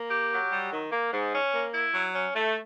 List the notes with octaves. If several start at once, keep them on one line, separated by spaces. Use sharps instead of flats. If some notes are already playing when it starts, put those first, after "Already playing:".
Already playing: A#3
G4
F#3
G3
D#3
A#3
G#2
C#4
A#3
E4
F#3
C#4
A3